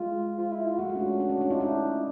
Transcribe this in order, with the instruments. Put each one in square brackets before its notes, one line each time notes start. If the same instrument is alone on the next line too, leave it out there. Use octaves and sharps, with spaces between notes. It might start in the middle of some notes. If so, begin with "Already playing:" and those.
Already playing: [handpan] G#3 [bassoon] F4
[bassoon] F4
E4
F4
[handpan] A3 [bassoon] F#4
[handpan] G#3
C#4
D4
D4
C#4
D4
[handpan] D#4 [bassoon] F4
[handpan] D4 [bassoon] E4